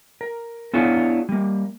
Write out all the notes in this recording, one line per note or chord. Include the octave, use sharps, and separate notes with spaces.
A#4
B3 D4 E4 F4 G#4 C#5
G3 A#3